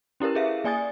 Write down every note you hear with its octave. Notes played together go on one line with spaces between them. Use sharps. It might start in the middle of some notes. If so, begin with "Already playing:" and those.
C#4 E4 G4 A#4 B4
G#4 E5 F5
A#3 D5 G#5 D#6 A6